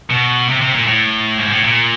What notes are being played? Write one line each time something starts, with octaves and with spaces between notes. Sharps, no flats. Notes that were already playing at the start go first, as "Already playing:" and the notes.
B2
C3
C3
A#2
A2
G#2
A2
A#2